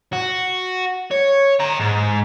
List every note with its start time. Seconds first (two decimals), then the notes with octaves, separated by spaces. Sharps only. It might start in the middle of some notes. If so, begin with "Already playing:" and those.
0.13 F#4
1.11 C#5
1.60 G5 A#5
1.80 G#2